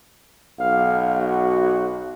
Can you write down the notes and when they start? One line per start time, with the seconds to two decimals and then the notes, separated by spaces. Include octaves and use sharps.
0.60 B1 F5
1.18 F#4